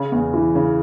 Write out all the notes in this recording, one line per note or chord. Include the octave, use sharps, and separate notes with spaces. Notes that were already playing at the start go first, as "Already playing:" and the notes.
Already playing: C#3
E2
E3
C#3